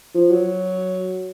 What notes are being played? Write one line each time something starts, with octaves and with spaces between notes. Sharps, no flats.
F3
F#3